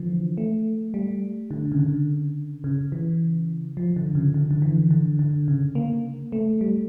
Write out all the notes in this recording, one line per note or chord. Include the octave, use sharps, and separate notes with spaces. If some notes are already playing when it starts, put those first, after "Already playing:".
Already playing: D3 E3 F3
A3
G3
D3
C#3
D3
C#3
E3
F3
D3
C#3
D3
D3
E3
D3
D3
C#3
A#3
A3
G3